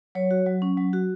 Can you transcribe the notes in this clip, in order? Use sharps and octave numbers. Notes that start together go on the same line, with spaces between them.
F#3 C#5
F#4
F#3
C#4
F#3
F#4